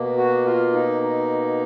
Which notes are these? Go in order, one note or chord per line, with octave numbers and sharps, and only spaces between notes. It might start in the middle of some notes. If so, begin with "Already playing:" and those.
Already playing: B2 A#3
F#4
F4
D#4
D#4